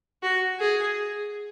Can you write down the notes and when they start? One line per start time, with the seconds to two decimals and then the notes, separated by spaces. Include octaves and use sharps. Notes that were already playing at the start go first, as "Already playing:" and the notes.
0.23 F#4
0.60 G#4